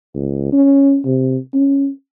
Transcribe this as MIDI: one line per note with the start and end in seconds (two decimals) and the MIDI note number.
0.15 0.52 37
0.52 1.00 61
1.06 1.37 48
1.54 1.89 61